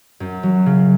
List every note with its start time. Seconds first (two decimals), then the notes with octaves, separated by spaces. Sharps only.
0.20 F#2
0.43 F#3
0.66 C#3